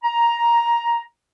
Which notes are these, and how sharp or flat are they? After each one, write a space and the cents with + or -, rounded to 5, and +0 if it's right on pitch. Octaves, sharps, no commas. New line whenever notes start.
A#5 +10